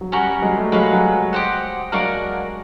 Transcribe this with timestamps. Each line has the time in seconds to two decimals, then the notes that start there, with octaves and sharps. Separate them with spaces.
0.01 F#3
0.12 G3 C#4 F#4 A#4
0.27 G3
0.42 F#3 G#3
0.57 G3 A3
0.72 F#3 G#3 A#3 C#4 F#4 B4
0.93 F#3
1.33 G4 C5 D#5 F#5
1.92 F#3 G#3 A#3 D4 F#4 A#4